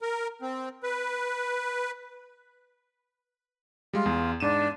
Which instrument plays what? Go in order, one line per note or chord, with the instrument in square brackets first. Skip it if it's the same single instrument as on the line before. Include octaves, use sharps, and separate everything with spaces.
[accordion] A#4
C4
B4
[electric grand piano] G3 G#3 [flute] F4
[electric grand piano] E2 G#4
[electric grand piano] G#2 D#7 E7 [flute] D4